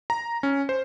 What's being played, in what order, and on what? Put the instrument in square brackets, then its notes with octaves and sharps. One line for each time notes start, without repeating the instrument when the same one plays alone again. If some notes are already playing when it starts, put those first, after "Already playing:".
[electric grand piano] A#5
C#4
C5